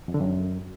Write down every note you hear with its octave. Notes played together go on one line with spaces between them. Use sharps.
F2
D3
F#2